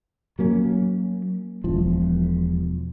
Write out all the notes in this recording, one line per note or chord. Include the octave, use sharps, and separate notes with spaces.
F#3 A#3 C#4
E1 F3